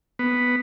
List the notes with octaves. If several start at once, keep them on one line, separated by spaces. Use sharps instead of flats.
B3